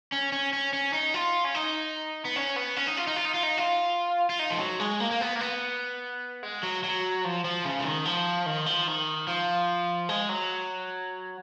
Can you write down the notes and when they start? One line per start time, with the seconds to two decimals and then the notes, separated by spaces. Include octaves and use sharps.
0.12 C#4
0.32 C#4
0.53 C#4
0.73 C#4
0.93 D#4
1.14 F4
1.45 C#4
1.55 D#4
2.25 B3
2.36 C#4
2.56 B3
2.76 C#4
2.87 D#4
2.97 F4
3.07 D#4
3.16 F4
3.25 D#4
3.34 F4
3.43 D#4
3.58 F4
4.30 F4
4.39 D#4
4.50 F3
4.60 F#3
4.80 G#3
5.00 A#3
5.11 A#3
5.21 B3
5.36 A#3
5.41 B3
6.43 G#3
6.63 F#3
6.84 F#3
7.24 F3
7.45 F3
7.65 C#3
7.79 F3
7.85 D#3
8.05 F3
8.46 D#3
8.66 F3
8.87 D#3
9.27 F3
10.09 G#3
10.29 F#3